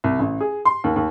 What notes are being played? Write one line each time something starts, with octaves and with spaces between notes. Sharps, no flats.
C2
A1
G#4
C6
D#2
D#2